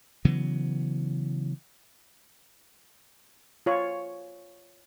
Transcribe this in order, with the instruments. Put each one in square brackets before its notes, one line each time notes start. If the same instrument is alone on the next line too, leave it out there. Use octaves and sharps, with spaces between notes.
[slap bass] C#3 E3 F#3 B3
[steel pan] F4 C#5